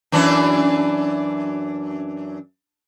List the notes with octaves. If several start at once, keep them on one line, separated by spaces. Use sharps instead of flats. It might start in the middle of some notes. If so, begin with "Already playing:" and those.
F#2 E3 D4